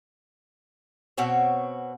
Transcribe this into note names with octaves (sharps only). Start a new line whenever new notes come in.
B2 C4 F#4 C#5